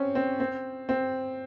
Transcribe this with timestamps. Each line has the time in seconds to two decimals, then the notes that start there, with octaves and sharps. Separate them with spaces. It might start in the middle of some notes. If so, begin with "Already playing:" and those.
Already playing: C4 C#4
0.15 C4
0.40 C4
0.89 C4